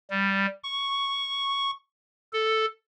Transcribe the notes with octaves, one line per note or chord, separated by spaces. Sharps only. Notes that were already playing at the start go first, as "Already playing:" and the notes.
G3
C#6
A4